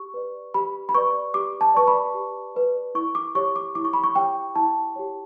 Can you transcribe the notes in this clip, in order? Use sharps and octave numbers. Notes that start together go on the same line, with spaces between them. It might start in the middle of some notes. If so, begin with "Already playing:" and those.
Already playing: G4 C#6
B4 D5
G4 B5
B5
B4 D5 C#6
G4 D6
A5
B4 D5 C#6
B5
G4
B4 D5
E4 C#6
D6
G4 C#5 C#6
D6
E4 D6
C#6
B5
C#6
G4 C#5 G5
E4 A5
G4 C#5